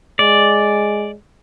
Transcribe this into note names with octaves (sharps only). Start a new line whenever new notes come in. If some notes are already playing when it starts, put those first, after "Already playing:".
G#3 D5